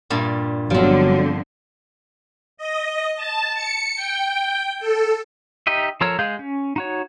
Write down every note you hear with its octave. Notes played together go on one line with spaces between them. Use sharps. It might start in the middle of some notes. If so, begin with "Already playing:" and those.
G2 A#2 G3
G1 D3 F3 F#3 C4
D#5
A5
C#7
G5
A4
D#4 G4 D#5 E5
F3 A4 A#4 C#5 E6
G#3 G#4 F5 G6
C#4
D#4 F#4 C#5